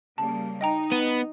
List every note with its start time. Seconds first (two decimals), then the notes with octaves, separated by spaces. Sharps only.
0.18 C#3 G3 A#3 A5
0.61 D#4 D#5 G5 A#5
0.92 B3 D#7